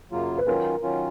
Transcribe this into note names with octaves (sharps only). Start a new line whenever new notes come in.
F#2 C#3 F#3 A#3 F4
B4
D#3 F#3 C#4 F4 A#4
D#3 F#3 C#4 F4